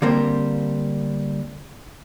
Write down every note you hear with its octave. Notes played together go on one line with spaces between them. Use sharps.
D3 G3 A#3 C4 A#4 C5